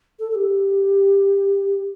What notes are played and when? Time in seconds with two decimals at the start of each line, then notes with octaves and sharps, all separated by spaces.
0.19 A4
0.31 A4
0.35 G4